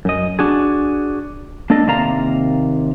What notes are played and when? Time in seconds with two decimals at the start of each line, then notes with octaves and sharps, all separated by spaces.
0.05 F#2 D#5
0.39 D4 F#4 G#4
1.70 A#3 D4 A4 D5 D#5 F5
1.87 D#2 C3 A#3 D5 F5 A#5